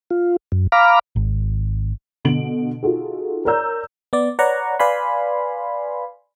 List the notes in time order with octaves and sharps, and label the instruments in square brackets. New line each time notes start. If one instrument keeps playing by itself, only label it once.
[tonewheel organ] F4
F#2
F5 A#5 B5 D6 F6
[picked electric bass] G#1
[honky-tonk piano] B2 D3 D7 F#7
D#4 F4 F#4 G#4 A4
A#4 C#5 D5 A#5 E6 G6
[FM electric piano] B3 D5
B4 C#5 D5 F#5 A#5 C#6
B4 D5 F5 G#5 B5 C6